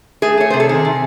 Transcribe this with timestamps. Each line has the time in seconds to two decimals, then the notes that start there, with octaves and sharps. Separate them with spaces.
0.22 A3 G#4
0.37 A3 C#5
0.50 C3 C5
0.60 A4
0.69 D#3 G#4
0.85 C3